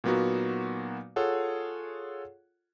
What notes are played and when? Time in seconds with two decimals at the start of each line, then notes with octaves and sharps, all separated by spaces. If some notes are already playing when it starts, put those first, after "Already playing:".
0.04 A#2 F#3 A#3 B3 D#4 F#4
1.16 F4 G#4 A4 C#5 F#5